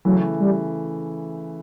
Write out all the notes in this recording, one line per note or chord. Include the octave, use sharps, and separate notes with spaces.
C#3 E3 F#3 A3
G3